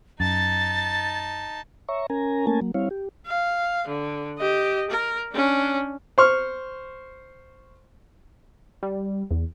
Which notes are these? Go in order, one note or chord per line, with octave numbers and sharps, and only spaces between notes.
F#2 D#4 A5 A6
C#5 E5 A#5 C#6
C#4 A#4 G#5 A#5
A3 A#3 C#4 A#4 G#5 A5
F#3 A#3
G3 C4 E4 C#5 F5
G4
F5
D3
G4 D#5
A#4
C#4 D4
C5 C#6 F6
G3
E2